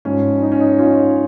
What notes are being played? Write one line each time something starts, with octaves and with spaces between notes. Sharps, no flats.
G#2 F3 C#4
D#4
C#4
D#4
C#4 F4